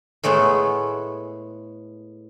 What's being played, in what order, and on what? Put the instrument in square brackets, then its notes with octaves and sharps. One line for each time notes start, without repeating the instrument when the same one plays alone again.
[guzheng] A2 G#3 A3 B3 G#4